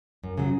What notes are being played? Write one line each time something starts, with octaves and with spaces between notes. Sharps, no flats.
F#2
C#3 F#3